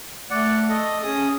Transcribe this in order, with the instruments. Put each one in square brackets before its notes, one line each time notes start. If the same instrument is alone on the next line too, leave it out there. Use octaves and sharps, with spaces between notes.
[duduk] A3 [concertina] D5 F#5
[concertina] A4 D#5
[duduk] C#4 [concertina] G#4 D#6